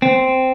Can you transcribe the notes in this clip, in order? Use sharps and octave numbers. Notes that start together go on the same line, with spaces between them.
C4